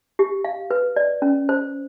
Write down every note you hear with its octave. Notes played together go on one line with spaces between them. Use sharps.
G4
F5
B4
D5
C#4
C5